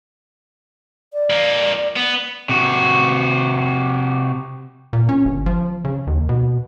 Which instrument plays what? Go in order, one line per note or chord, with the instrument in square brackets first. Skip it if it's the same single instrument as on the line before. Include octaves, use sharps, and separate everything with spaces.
[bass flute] D5
[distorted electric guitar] F2 A#3
B3
[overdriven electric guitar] C3 F#4
[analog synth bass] A#2
C#4
G1
F3
C#3
D#2
B2